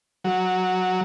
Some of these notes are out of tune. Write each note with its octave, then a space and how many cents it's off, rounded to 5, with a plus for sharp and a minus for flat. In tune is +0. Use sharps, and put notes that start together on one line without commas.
F#3 -5